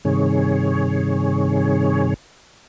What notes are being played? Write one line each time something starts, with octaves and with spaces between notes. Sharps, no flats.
G2 C3 D#3 G#4 C#5